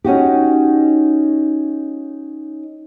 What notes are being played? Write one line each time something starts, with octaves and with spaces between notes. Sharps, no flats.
C#4 D#4 F#4 G4